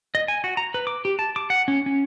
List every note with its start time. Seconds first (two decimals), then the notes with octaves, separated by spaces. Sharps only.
0.15 D#5
0.28 G#5
0.44 F#4
0.57 A#5
0.74 B4
0.87 D6
1.05 G4
1.19 A5
1.36 D6
1.50 F#5
1.68 C#4
1.86 C#4